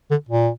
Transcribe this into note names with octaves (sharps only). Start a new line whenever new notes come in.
D3
A#2